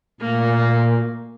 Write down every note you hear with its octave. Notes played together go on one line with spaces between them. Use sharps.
A#2 A3 A#3